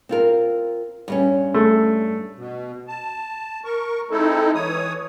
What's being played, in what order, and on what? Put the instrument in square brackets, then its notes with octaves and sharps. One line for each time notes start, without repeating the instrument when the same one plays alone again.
[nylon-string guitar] C4 F4 A#4
G2 G3 C#4
[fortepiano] A3
[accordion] B2
A5
A#4 C#6
G#3 C4 D#4 E4 A4
E3 C#5 D#6